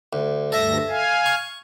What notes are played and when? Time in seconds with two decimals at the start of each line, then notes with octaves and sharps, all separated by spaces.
0.13 D2
0.52 D2 G2 A4 E5 A#6
0.89 F5 G#5
1.26 C#6